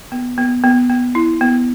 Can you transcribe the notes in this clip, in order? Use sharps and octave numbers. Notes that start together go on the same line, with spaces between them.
B3
B3
B3
B3
E4
B3